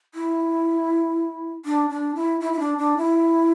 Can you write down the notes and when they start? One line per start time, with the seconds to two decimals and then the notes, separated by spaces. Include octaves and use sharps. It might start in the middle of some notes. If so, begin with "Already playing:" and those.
0.14 E4
1.65 D4
1.90 D4
2.15 E4
2.40 E4
2.53 E4
2.59 D4
2.78 D4
2.97 E4